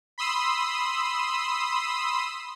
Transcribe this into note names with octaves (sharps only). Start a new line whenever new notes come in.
B5 C6 D#6 E6